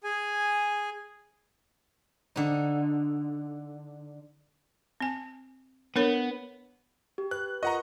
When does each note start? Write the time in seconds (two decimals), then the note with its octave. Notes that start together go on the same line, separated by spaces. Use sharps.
0.04 G#4 G#5
2.36 D3 D#4
5.00 C4 G#5
5.96 B3 D4 A#4 C#5
7.18 G4
7.31 B4 F#6
7.63 F4 A#4 D#5 F#5 A#5 C#6